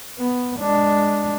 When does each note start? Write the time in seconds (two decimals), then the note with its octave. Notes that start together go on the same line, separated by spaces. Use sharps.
0.18 B3
0.60 G#3 D4